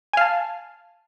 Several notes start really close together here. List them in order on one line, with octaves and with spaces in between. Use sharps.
G#5 F5 A5